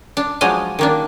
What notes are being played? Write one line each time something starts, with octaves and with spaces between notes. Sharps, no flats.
D4
F3 F#3 G#3 D4 D#5
D#3 A#3 D4